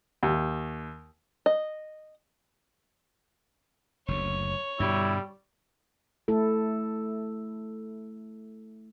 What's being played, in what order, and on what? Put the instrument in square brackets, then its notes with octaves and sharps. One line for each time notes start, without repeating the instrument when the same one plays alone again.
[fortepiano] D#2
[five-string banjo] D#5
[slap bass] F#1 D2 [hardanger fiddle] C#5
[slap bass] G2 B2 D3 [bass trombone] G3 [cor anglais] E4
[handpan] A3 E4 A4